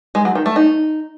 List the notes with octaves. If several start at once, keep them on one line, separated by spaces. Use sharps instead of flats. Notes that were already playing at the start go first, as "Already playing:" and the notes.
G#3
F#3
D#3
A3
D#4